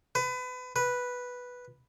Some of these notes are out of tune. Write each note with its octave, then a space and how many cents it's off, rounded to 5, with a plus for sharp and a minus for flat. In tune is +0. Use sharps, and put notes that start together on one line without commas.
B4 +30
B4 -5